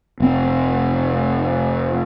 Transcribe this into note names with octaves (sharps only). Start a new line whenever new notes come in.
F1 C4